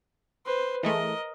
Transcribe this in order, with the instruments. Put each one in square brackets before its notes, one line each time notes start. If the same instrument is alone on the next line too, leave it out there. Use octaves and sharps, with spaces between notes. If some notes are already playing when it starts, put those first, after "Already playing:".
[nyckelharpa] B4 C5
[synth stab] E3 G#3 A3 [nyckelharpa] A#4 D#5